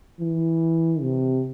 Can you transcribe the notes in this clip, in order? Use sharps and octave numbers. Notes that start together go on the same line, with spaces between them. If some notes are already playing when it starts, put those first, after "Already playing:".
E3
C3